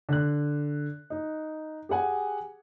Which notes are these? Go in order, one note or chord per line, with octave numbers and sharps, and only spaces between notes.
D3 F#6
D#4
G4 G#4 F#5 G#5